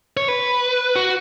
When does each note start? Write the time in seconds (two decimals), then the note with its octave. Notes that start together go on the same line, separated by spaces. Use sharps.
0.17 C#5
0.28 B4
0.96 F#4